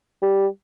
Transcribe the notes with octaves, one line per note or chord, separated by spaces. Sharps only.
G3